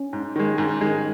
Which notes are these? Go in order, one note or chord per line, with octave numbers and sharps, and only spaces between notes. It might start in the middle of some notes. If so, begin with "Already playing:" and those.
Already playing: C#4
G#2
D#3 G#3
G#2
D#3 G#3